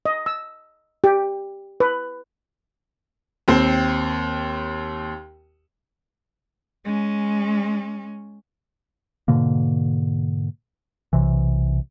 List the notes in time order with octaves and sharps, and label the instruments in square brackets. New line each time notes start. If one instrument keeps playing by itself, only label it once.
[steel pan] D#5
E6
G4
B4
[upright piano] D#2 C4
[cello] G#3 C#4
[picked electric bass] G#2 B2 D3 A#3
B1 C3 E3